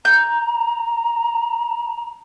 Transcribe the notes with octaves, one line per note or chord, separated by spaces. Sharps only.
A#5 G6